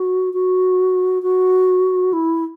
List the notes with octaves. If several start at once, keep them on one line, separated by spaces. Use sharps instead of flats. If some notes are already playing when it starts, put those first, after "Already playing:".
Already playing: F#4
F#4
F#4
E4